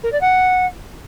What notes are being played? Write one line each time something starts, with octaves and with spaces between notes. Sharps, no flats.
A#4
D5
F#5